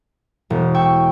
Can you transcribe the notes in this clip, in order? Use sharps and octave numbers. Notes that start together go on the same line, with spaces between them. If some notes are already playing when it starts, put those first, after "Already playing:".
E1
G5 C#6 E6